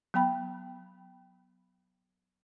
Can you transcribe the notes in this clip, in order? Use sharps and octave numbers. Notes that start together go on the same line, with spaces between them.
F#3 B3 G5 B5